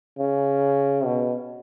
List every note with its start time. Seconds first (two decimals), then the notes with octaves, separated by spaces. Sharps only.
0.19 C#3
1.05 B2